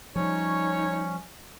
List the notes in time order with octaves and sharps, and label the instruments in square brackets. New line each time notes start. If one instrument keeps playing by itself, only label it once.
[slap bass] F3 G3 [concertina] C#4 [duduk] D#4 [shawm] C#5